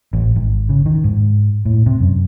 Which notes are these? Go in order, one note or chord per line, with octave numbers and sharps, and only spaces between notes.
A1
G#1
C#3
D#3
G#2
A2
C3
F#2